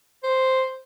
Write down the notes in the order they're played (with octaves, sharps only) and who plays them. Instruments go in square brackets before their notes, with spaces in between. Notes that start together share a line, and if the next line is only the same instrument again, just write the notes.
[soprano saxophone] C5